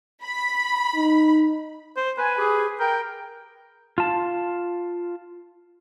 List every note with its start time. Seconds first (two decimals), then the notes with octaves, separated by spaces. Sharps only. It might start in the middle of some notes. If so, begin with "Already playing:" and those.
0.23 B5
0.96 D#4
1.96 C5
2.18 B4 G#5
2.37 G4 G#4
2.80 A#4 G5
3.98 F4 A5